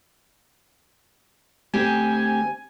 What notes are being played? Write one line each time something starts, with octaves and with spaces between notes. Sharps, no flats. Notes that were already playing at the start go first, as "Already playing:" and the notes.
D2 C4 G4 G#5